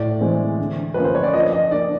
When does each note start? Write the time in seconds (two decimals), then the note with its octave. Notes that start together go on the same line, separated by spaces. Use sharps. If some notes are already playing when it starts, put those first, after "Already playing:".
Already playing: A2 D5
0.21 E3 G#3 C4
0.59 D3
0.94 F3 A#3 C#4 B4
1.04 C5
1.15 C#5
1.23 D5
1.34 F3 D#5
1.52 D#5
1.71 A#3 D4 D5